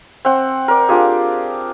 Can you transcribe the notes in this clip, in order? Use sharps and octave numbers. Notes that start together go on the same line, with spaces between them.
C4 F#5
A#4 D5
D4 F4 G4 G#4